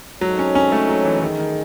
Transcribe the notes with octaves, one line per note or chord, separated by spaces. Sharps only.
F#3 G#3 C4 D#4 A4 C#5
C#4
C#4
A3
F#3
E3
D#3 A3 D#4 G#4
D#3